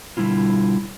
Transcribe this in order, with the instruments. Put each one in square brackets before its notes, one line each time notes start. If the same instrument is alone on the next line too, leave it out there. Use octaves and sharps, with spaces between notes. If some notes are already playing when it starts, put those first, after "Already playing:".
[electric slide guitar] B2 D3 G3 B3 E4 F4